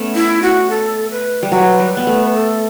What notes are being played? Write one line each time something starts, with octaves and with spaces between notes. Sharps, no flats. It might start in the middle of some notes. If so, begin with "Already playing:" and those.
Already playing: A3 B3 C#4
E4
F#4
A4
B4
G3
F#3 B4
G3
B3 B4
A3
A4